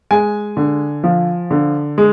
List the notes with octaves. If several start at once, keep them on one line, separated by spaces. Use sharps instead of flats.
G#3 G#5
D3
F3
D3
G#3